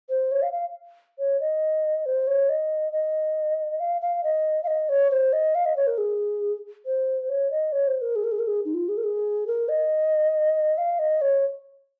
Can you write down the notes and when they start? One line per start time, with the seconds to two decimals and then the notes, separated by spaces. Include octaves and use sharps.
0.09 C5
0.32 C#5
0.42 F5
0.53 F5
1.19 C#5
1.40 D#5
2.06 C5
2.27 C#5
2.49 D#5
2.93 D#5
3.80 F5
4.01 F5
4.23 D#5
4.63 F5
4.67 D#5
4.89 C#5
5.11 C5
5.33 D#5
5.55 F5
5.66 D#5
5.76 C#5
5.87 A#4
5.98 G#4
6.86 C5
7.29 C#5
7.51 D#5
7.72 C#5
7.87 C5
8.01 A#4
8.16 G#4
8.24 A#4
8.32 G#4
8.39 A#4
8.47 G#4
8.65 D#4
8.74 F4
8.89 G#4
8.97 A#4
9.04 G#4
9.47 A#4
9.69 D#5
10.78 F5
10.99 D#5
11.21 C#5